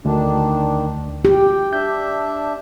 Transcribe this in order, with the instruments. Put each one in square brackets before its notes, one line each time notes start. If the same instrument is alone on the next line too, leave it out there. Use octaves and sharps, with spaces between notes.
[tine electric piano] D2 [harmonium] D#3 D4
[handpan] G4 [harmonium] G5
[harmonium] D4 E5 [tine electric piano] G6